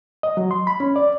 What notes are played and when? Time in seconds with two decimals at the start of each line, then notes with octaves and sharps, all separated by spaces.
0.23 D#5
0.37 F#3
0.51 C6
0.67 B5
0.80 C#4
0.96 D5